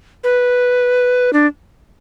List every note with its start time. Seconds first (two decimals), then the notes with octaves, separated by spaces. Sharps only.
0.24 B4
1.33 D4